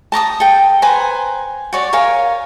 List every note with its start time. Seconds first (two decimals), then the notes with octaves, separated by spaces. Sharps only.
0.12 A5 A#5 D6 D#6
0.40 A4 G5
0.82 B4 C5 G#5 A#5
1.73 F#4 C#5 D5
1.93 A#4 C#5 F5 G#5